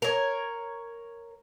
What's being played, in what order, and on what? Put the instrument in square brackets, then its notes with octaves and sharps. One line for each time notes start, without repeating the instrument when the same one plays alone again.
[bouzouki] A#4 C#5